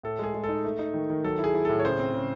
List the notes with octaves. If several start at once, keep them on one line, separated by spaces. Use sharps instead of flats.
A2 A4
G#3 G#4
G#3
A4
D#4
A3
D#4
D#3
D#3
F#3 A4
E4
G#4
E4
A2 A4
C#5
C#3 G#4 C5
C4
C#3